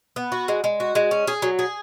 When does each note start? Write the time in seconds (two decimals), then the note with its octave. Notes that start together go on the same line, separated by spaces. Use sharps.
0.16 B3
0.32 F#4
0.48 G#3
0.64 G#3
0.80 F#4
0.95 G#3
1.11 C#4
1.27 G#4
1.42 F#3
1.59 G#4